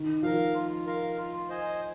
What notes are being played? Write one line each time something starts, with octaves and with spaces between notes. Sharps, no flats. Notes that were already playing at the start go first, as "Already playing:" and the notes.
Already playing: D#3
F3 A#4 F5
F4
A#4 F5
F4
C5 D#5 G#5